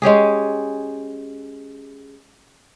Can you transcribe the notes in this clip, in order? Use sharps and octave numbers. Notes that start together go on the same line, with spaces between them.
G#3 C#4 G4 G#4